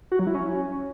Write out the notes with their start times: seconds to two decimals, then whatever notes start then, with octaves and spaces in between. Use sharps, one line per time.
0.12 F#4
0.19 F#3
0.27 E4
0.35 C#4